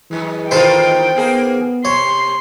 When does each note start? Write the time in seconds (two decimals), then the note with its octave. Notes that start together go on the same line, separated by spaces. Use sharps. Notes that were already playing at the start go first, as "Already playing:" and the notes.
0.11 F#2 E3 G#3
0.51 D#3 F4 A4 B4 C5 G5
1.16 A#3 B3 G#4
1.85 C3 C#5 C6